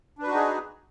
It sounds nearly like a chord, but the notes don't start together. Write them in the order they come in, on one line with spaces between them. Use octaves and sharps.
D4 B4 F#4 D#4 G#4